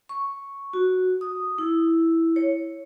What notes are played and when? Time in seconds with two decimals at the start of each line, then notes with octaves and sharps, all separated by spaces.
0.09 C#6
0.73 F#4
1.21 D#6
1.58 E4
2.36 C#5